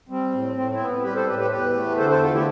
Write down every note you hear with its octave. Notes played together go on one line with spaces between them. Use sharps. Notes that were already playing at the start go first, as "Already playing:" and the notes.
G3 C4
A2
A2 C4
C4 E4
B3
G3 G4 B4
A4 C5
A2 G4 B4
G4 B4
E2 G4 B4
A3
D3 A4 C5
A4 C5
E2 F4 A4
E4 G4